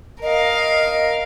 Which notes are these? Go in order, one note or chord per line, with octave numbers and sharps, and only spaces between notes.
A#4 D#5 F5